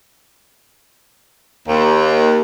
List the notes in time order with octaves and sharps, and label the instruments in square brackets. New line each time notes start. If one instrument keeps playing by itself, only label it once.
[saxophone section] D#2